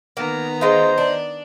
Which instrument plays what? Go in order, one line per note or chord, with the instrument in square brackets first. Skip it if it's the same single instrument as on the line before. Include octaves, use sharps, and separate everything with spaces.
[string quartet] D#3 B3 A#5 [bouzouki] A#3
[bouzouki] G#3 F4 [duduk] C5 [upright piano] D#5
[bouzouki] D4